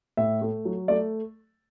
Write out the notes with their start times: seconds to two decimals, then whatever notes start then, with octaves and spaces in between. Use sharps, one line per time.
0.17 A2 E5
0.41 A3
0.65 F#3
0.88 A3 D5